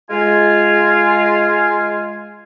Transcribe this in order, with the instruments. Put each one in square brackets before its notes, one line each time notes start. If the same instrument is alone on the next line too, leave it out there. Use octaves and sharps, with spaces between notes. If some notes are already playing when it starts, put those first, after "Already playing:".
[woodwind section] G#3 F4 G#5